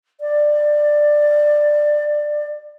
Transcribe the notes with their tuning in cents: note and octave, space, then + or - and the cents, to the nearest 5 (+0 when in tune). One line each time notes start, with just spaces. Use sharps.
D5 +15